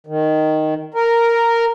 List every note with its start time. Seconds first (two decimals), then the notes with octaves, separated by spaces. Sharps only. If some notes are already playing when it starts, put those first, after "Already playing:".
0.07 D#3
0.94 A#4